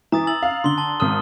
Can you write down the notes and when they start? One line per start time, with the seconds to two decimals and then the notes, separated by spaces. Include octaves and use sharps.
0.12 E3 A#5 D#6 A6
0.27 E6 A6 F#7
0.42 F5
0.64 D3 C6 G7
0.78 A5 G7
1.00 G#1 D#6 F6